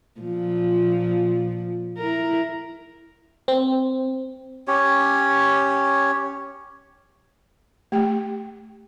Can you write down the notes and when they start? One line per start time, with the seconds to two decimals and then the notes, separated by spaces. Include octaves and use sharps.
0.20 A#2 F3
1.98 E4 A#4
3.48 C4
4.68 C#4 G4 C#5
7.92 A3 G4 G5